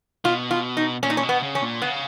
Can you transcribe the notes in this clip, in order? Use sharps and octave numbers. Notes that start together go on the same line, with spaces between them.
B2 F4
F4
D#4
A#2 C#4
D#4
C#4
B2
B3
C#3
C#4
A#2
C#3 B3